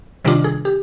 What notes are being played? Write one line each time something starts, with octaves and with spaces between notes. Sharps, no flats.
C3 D#3 G3 D4 F4
G#4
G4